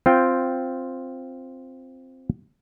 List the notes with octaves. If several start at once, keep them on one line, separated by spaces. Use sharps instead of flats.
C4 F4 G5